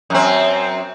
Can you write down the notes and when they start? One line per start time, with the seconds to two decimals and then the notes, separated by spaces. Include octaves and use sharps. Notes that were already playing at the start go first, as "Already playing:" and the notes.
0.10 F#2 C4